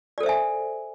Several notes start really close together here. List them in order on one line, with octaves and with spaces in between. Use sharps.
D5 A4 C5 E5 G#5